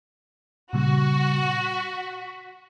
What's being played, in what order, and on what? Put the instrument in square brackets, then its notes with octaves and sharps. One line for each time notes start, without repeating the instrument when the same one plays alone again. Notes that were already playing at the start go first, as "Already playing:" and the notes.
[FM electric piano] A#2 C#3 G3 [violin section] F#4
[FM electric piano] B6